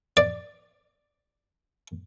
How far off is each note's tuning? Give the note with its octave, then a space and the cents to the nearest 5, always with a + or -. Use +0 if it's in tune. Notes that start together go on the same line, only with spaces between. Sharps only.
D5 +5